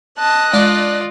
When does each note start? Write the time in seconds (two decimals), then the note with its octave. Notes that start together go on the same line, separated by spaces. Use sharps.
0.18 D#5 A5 F#6
0.53 G#3 D4 F4 D5